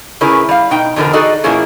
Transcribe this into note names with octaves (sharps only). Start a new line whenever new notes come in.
C#3 C#4 E4 G#4 A#4 B4
G3 F5
B2 D#4 G5
E2 B2 D3 F3 D4 A#4
D#4 F#4 G#4 A4 D5 D#5
B2 F3 A#3 C#4 E4 G#4